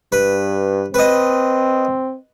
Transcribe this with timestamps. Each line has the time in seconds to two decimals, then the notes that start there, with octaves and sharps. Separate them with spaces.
0.12 G2 B4
0.94 C4 B4 D#5